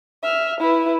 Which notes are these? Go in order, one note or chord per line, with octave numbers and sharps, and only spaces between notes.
E5 F6
E4 B4